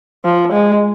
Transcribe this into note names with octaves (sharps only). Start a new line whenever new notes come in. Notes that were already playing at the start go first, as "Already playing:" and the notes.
F3
G#3